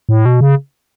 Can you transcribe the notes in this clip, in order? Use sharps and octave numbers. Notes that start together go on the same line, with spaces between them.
A2
B2
C#3